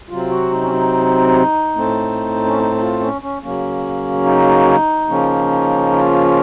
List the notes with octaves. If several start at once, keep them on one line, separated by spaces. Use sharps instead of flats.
C3 F#3 C4 F4
F#4
D#4
C#4
D#4
A2 A3 C4
C#4
D#4
D#4
F4
C#4
C#4
C#3 F#3 A#3 C#4
D#4
C#3 F3 A#3 C#4
F4